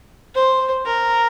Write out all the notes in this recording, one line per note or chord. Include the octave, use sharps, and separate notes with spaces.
C5
A#4